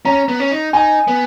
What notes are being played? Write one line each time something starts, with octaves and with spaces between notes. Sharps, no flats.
C#4 A#5
B3
C#4
D#4
D#4 G#5
B3